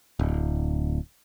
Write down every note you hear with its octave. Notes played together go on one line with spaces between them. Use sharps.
D1